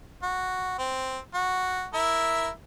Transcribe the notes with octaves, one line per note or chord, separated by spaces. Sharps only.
F#4
C4
F#4
E4 A#4 E5